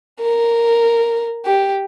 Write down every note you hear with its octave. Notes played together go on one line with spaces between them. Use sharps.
A#4
G4